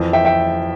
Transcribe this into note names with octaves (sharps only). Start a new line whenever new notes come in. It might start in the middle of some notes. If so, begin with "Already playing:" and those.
Already playing: F2 E3
E5 G5
E5 G5